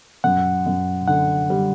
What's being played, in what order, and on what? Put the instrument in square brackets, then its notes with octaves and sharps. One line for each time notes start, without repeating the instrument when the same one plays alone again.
[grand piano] F#2 [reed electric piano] F#5
[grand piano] F#2
[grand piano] D3 [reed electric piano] F#5
[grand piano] G3